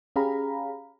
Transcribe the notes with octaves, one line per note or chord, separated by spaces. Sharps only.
C#4 G4 G#4 F5 A#5 B5